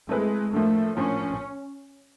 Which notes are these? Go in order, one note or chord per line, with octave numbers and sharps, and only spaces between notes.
G#3 A3 C4 E4 G#4 B4
A2 F3 A3 A#3 D4
A2 F3 A#3 C#4 D4